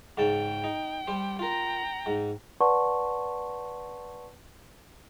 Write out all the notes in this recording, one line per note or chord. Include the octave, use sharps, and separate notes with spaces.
G#2 C#3 G5 A5
D#4
G3 G4 C5
F4 A#4 G5 A#5
G#2
B4 D5 F#5 A5 C6 C#6